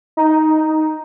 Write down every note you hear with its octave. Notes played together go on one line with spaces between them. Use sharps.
D#4